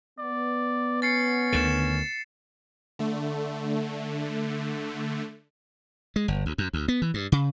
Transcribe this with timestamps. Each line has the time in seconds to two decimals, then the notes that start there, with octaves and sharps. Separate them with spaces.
0.19 B3 D5
1.02 C#4 A6 C7 C#7
1.53 D2 D3 D#3 A6 E7
2.99 D3 A3
6.16 G#3
6.28 G1
6.46 D2
6.58 F#2
6.73 D2
6.88 B3
7.02 E3
7.14 G2
7.32 C#3